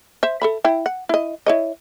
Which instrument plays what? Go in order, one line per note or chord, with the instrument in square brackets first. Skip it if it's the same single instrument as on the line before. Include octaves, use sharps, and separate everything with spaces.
[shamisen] C5 E5
A4 E5 B5
E4 G5
F#5
E4 D#5
E4 C#5 D#5